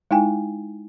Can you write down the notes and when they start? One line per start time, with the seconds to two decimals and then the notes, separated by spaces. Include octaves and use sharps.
0.11 G#3 D#4 E4 G5 G#5